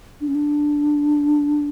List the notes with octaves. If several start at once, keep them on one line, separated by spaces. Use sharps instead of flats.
D4
C#4
D4